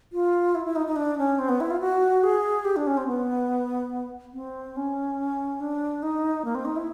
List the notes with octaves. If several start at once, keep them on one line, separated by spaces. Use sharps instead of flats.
F4
E4
E4
D#4
D#4
D4
C#4
C4
B3
E4
F4
F#4
G#4
G4
D4
C#4
C4
B3
C4
C#4
D4
D#4
A#3
C4
D#4
E4